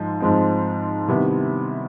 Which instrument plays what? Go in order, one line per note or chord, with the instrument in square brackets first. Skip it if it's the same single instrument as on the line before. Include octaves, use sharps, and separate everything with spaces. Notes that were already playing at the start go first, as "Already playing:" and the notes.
Already playing: [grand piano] G#2 F3 G#3
G#2 F3 G#3 C4
C3 D#3 G3 B3 E4